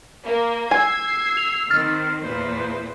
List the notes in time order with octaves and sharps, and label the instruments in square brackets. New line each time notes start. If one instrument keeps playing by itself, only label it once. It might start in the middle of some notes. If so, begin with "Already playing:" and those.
[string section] A#3
[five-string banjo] G#5 [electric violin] E6 C7 [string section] G#6
[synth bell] F7
[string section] D#3 C4 [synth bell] F6 A6
[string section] E2 A#2 [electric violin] B4 C5